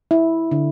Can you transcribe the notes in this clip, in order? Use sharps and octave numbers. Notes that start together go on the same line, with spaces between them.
E4
D3